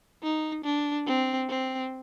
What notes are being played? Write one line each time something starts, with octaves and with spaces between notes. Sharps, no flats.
D#4
D4
C4
C4